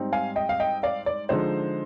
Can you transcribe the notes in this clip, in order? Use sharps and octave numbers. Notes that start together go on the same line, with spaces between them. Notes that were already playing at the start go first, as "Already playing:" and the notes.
Already playing: G#2 G3 C4 D#4
F5 G#5
D#5 G5
F5
D#5 G5
D5 F5
D5
D3 F3 G#3 D#4 C5